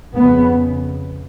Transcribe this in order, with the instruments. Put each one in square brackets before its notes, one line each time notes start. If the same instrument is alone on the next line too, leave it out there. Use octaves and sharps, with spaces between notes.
[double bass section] F2 C#3 B3